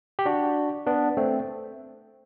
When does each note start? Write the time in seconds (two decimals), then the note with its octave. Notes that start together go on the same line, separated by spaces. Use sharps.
0.19 G4
0.26 D4 F#4
0.86 B3 D4
1.17 A3 C4